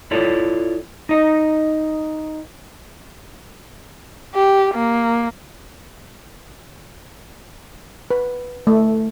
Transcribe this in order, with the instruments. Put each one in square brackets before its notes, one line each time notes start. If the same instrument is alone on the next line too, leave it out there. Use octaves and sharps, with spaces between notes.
[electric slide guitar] E4 F4 A4 C#5 D5
D#4 D#5
[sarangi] G4
A#3
[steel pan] B4
A3